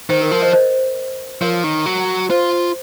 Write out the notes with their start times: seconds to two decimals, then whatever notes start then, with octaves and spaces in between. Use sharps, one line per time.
0.09 D#3 C5
0.21 A#4
0.31 F3 A#4
0.42 C5 D#5
0.53 C5 D#5
1.42 F3 A#4 C#5
1.64 D#3
1.86 F#3
2.30 F4 C5